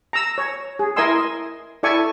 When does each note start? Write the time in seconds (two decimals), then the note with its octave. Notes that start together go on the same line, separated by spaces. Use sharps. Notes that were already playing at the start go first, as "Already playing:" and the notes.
0.13 A#5 E6
0.38 C#5
0.79 G#4
0.96 E4 A#4 D#5 G#5 C6 E6
1.83 E4 A4 D5 E5 G#5 C#6